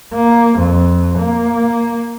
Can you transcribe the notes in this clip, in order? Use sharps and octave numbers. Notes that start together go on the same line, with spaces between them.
A#3
F2
A#3